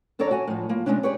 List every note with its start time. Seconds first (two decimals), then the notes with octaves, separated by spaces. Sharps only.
0.19 F2 D4 A4 C#5 D5 A#5
0.31 F#4 G#5
0.47 A2 F3
0.69 F3 A#3
0.86 C3 E3 G#3 A3 C#4 D4
1.03 G4 G#4 B4 C#5 D5